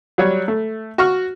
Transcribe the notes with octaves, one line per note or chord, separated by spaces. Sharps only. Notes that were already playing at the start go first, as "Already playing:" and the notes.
F#3 G3 C#5
A3
F#4 C#6 F6